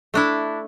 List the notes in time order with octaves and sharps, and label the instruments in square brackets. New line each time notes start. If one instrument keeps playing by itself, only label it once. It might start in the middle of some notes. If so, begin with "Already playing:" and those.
[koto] A3 D4 E4